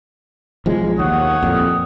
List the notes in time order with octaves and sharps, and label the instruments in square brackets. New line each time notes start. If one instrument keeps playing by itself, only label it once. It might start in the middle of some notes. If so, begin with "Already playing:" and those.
[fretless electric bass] B1 F3 G#3
[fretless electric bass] D#2 [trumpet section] C#5 F#5 D#6
[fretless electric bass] F2 A#2